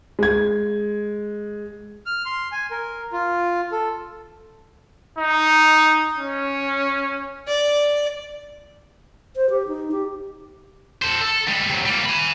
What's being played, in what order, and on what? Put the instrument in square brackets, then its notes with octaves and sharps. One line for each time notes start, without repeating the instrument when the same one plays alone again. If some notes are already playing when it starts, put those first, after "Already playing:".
[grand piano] G#3 G#6
[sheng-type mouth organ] F6
C6
G#5
A#4
F4
A4
[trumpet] D#4
C#4
[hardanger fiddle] D5
[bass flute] C5
G4
D#4
G4
[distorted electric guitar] A4 C5
A4
G3 G#3
C3 F#3
G3 A#3
G#5 B5